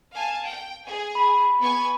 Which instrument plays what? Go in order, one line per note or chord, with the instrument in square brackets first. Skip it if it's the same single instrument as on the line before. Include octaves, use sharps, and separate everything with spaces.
[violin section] F5 G#5 A5
G5
G#4 G#5
[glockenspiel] B5 B6
[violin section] B3 G#5 C#6